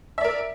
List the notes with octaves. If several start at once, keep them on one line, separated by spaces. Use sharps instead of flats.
A#4 D5 E5